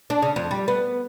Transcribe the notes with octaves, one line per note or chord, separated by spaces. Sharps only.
D4
C#3
F2
G3
B3